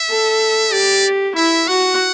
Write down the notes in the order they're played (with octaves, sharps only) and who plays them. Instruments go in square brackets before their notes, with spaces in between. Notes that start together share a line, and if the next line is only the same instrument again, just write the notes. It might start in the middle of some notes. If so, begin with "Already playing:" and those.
Already playing: [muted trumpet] E5
[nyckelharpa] A4
[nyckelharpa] G4 [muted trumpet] D5
[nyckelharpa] E4 [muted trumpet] E5
[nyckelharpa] F#4 [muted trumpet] F#5